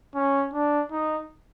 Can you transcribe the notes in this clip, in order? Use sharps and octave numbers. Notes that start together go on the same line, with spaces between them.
C#4
D4
D#4